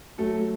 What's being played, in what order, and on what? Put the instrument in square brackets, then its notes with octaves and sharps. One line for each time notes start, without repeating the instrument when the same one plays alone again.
[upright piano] F#3 A3 A4